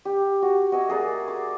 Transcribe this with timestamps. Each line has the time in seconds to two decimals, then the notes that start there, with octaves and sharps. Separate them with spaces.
0.05 G4
0.42 F#4
0.72 F#4 D#5 E5 G#5
0.88 A#3 G#4 A#4 D5
1.28 D6